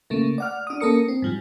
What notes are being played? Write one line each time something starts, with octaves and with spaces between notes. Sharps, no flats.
C#3 A3 A#3
D5 F#5 F6
D4 D#6
A#3 C#4 A4 A#4 D#6 C#7
C4
G#2 F3 G3